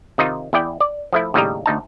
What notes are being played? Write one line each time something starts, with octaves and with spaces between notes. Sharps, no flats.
C3 D#3 D#4 F4
E2 E4 D5 G5
D5
F3 A3 E4
D#2 A2 C#3 G3 D#5 A#5
D2 D#4 A5